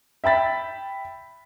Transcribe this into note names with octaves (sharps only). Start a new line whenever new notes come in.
E5 G5 B5 A6 B6